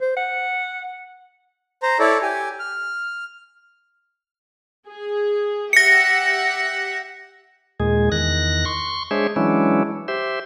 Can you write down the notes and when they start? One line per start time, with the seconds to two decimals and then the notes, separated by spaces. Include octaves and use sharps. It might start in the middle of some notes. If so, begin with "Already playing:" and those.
0.01 C5
0.17 F#5
1.83 C5 A#5
1.99 E4 A4 C#5 D5
2.22 G4 G#5
2.59 F6
4.87 G#4
5.73 G4 E5 F#5 A#6 C#7
7.80 D#2 A#2 G#3 G#4
8.12 E2 D#3 F#6 A#6
8.65 C6 C#6
9.11 G#3 D4 G#4 C5 C#5 E5
9.36 E3 F#3 G#3 C#4 D4 E4
10.08 G4 C5 E5